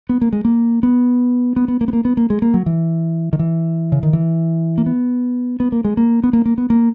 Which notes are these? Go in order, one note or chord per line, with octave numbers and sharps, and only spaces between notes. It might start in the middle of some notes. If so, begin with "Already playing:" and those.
B3
A#3
G#3
A#3
B3
B3
B3
A#3
B3
A#3
B3
A#3
G#3
A#3
F#3
E3
D#3
E3
C#3
D#3
E3
A#3
B3
B3
A#3
G#3
A#3
B3
A#3
A#3
B3
A#3